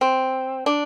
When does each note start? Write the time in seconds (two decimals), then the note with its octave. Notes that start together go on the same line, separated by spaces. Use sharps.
0.01 C4
0.66 D4